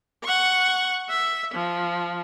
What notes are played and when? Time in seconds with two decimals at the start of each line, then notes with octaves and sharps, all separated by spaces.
0.24 F#5 C#6
1.09 E5
1.54 F3